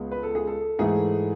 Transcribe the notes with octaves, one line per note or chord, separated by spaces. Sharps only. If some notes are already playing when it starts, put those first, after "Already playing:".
Already playing: C#2 G#3 B3
B4
A4
G#4
A4
G#2 E3 A3 G#4